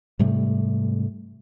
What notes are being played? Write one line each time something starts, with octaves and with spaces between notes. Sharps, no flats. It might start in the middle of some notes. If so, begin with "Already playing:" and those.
G#2 C3 G3 A3